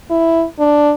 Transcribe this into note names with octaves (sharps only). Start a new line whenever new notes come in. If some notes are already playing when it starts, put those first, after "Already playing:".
E4
D4